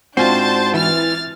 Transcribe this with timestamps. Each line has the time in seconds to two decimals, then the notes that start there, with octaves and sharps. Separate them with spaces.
0.17 G#2 C4 D4 F4 F#4 C5 A5 G6
0.74 E3 F6 A6